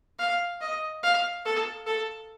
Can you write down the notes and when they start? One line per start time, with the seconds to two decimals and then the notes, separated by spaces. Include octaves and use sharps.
0.19 F5
0.61 D#5
1.03 F5
1.45 A4
1.86 A4